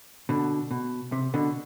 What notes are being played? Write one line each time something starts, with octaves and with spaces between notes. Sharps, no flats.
B2 D3
B2
C3
B2 D3